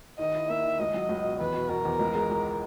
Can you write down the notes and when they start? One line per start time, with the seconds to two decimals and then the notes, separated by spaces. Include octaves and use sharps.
0.19 D#3 D#5
0.35 E4
0.49 A#3 E5
0.65 D#3
0.79 C#2 D#5
0.94 F#3
1.09 C#2
1.24 B2
1.40 E2 B4
1.54 B2
1.69 B2 A#4
1.85 E2
1.99 C#2
2.15 G#3
2.30 C#2